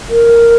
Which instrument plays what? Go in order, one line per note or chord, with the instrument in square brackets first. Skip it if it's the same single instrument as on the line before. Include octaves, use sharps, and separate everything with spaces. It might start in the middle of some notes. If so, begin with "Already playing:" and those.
[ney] A#4